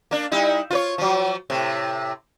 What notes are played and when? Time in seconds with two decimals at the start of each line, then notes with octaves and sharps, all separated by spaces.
0.11 A#3 D4
0.32 G3 D#4 E4
0.71 F4 B4 C#5
0.98 F3 F#3
1.50 A2 C3